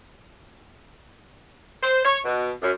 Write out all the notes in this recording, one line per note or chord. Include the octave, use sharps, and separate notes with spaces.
C5
C#5
B2
F#2